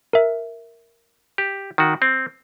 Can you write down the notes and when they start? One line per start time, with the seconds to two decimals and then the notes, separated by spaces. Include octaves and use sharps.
0.13 A#4 E5
1.38 G4
1.78 D#3 F#4
2.02 C4